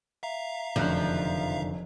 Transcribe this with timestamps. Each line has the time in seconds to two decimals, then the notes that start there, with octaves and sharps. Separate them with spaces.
0.23 E5 F5 A#5
0.76 F1 F#2 D3 D#3 F3 F#6